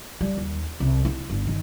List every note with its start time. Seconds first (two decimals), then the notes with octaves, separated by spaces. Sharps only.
0.21 G3
0.38 D#2
0.80 C2
1.05 E4
1.30 G1
1.47 D#3